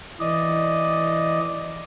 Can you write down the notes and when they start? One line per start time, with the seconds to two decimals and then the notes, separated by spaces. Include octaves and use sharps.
0.20 E3 D5 D#5